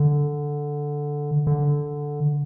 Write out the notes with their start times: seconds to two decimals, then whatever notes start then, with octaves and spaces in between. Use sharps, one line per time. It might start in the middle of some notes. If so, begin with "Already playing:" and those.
Already playing: D3
1.47 D3